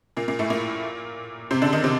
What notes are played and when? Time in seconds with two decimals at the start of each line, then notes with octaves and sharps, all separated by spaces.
0.17 A#2 A#3
0.28 A#2 A#3
0.39 A2 A3
0.50 A#2 A#3
1.51 C3 C4
1.62 D3 D4
1.73 D#3 D#4
1.84 C3 C4